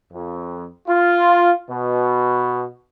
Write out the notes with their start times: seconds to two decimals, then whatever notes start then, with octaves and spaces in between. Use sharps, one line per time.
0.11 F2
0.88 F4
1.69 B2